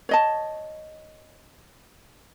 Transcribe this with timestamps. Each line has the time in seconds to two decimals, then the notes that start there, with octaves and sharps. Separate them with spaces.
0.09 C#5 D#5 A5